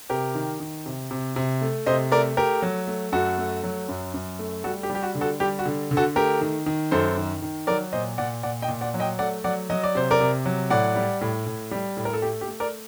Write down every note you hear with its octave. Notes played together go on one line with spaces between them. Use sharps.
C3 G4 A#4
D#3
D#3
C3
C3
C3
A3
C3 C5 D#5
A3 A#4 D5
A3 G4 A#4
F#3
A3
F#2 F#4 A4
A3
F#3
F#2
F#2
A3
G3 F#4 A4
G4
G3
G4
F#4
D3
F#4 A4
G3 G4
F#4
D3
D3
F#4 A4
A3 G4 A#4
D#3
D#3
F#2 A4 C5
D#3
D#3
F#3 A#4 D5
A#2 C5 D#5
A#2 D5 F#5
A#2 D5 F#5
D#5 G5
A#2
D5 F#5
F#3
D#5 G5
A3 D5 F#5
F#3 D5 F#5
F#3 D#5
D5
C3 C5
A#4 D5
C3
F#3
A2 D5 F#5
G3
A2
A2
G3
A2
A#4
A4
A3 G4
G4
A3
A#4 D5